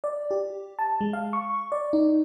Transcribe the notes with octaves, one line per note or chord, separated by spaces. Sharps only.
D5
G4
A5
G#3
F5
C#6
D5
D#4